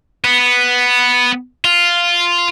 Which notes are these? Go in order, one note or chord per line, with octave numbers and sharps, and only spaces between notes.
B3
F4